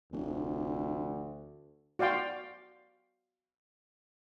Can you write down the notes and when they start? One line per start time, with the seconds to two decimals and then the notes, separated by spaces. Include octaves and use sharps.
0.12 F1 D2
1.99 F#4 D5 F5 G5 C6